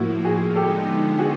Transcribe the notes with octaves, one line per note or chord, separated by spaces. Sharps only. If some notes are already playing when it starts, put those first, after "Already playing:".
Already playing: A2 F3 A#3 E4 F#4
F#4 G#4
D3 F3 G#3 B3 D#4 G4 A4
F#4 G#4